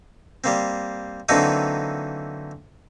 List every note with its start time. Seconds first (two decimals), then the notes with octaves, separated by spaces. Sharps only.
0.44 G3 A#3 C4
1.29 D3 E3 F#3 A#3 C4 D#4